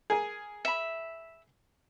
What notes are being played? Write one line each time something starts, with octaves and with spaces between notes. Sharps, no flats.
G#4 A#4 G#5
E5 B5